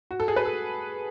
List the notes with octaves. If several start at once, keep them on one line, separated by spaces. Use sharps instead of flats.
F#4
A4
G#4
B4
A4